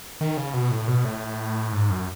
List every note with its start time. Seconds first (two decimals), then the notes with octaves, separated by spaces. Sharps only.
0.21 D#3
0.37 C#3
0.54 B2
0.71 A2
0.88 B2
1.05 A2
1.73 G#2
1.90 F#2